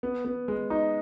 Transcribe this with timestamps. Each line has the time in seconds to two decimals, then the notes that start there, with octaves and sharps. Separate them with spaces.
0.03 B3
0.25 B3
0.48 G#3
0.70 D#4